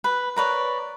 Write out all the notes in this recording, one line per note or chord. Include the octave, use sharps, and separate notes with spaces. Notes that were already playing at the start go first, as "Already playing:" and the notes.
B4
A#4 B4 C#5 D5